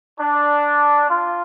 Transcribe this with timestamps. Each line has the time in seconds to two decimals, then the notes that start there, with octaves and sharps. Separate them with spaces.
0.20 D4
1.09 F4